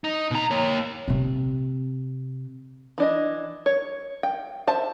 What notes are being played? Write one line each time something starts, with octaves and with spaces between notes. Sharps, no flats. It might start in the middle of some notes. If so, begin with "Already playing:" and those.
D#4
B2 A#5
A#3 C#5
C3 C4
E3 D4 D#5
C#5
G5
C5 E5 A5